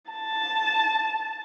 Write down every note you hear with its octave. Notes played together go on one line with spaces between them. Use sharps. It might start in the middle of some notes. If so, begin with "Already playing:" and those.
A5